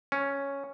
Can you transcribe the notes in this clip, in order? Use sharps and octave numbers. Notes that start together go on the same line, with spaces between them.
C#4